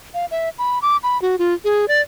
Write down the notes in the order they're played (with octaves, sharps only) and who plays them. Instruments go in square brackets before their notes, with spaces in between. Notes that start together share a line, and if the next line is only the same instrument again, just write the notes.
[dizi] F5
E5
B5
D6
B5
F#4
F4
G#4
D5